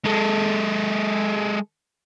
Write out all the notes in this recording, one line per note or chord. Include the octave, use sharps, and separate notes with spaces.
G#3 A4